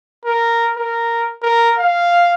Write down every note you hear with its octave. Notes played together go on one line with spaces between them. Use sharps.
A#4
A#4
A#4
F5